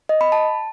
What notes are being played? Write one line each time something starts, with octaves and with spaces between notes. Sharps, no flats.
D#5
B5
A5